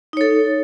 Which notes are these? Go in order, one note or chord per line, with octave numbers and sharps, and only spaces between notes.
D#4 A4 C#5